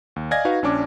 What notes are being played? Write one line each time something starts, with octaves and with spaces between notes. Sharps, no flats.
D#2
D5 D#5 F5 G#5 G#6 A#6
D#4 F#4 B4 F5
A#1 C#4 D4 D6